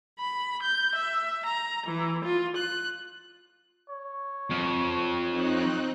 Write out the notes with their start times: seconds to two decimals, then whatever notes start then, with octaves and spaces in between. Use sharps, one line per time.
0.19 B5
0.63 G6
0.94 E5
1.45 A#5
1.86 E3
2.23 F4
2.56 F#6
3.90 C#5
4.50 F2
5.29 C4 D#4 F#6